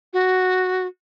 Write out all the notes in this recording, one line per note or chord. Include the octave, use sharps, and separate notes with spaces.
F#4